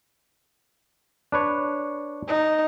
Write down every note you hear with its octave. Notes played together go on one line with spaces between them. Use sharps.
D4 B4 C#5
D#4